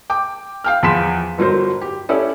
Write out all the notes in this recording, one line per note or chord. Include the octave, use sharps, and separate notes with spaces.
G5 D6
F5 G5 F6
E2 F3 B5 C6 B6 E7
G1 F#3 A#4 C5
G4
C#4 E4 G4 A4 D5